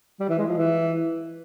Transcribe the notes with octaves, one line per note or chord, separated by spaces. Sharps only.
G3
E3
G#3
F3
E3